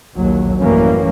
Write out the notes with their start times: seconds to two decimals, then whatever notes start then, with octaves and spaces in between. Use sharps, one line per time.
0.15 A#1 D#2 F#3
0.60 A1 F#2 E3 G3 A#3 C#4